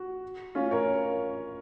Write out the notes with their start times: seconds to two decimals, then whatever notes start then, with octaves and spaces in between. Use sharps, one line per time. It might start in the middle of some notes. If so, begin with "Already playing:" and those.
Already playing: F#4
0.55 C#4 F4
0.71 A#4 C#5